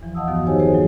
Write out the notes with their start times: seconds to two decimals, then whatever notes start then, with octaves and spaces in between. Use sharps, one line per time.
0.01 E2 E3 F3
0.15 D#5 F5 F#5 A5 D#6 E6
0.28 G2 D#3 F3 B3 F#4
0.46 D#4 G4 C5 C#5 G#5
0.59 C4 F#4 G#4 A4 C5
0.71 A#2 F#3